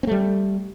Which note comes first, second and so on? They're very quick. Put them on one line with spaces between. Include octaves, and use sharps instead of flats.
C4 A3 G3